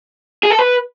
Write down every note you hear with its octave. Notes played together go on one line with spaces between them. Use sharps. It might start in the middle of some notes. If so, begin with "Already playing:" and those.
G#4
A4
B4